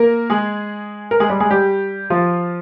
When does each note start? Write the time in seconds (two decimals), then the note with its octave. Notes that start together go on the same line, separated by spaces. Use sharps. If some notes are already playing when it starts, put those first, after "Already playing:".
Already playing: A#3 A#4
0.30 G#3 G#4
1.11 A#4
1.20 G#3 G#4
1.30 G3 G4
1.40 G#3 G#4
1.50 G3 G4
2.10 F3 F4